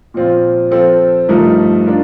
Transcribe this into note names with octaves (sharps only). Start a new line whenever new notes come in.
A#2 F3 C4 F4
F3 C4 F4 A4
G2 F3 A3 D#4 A#4
D4 F4 A#4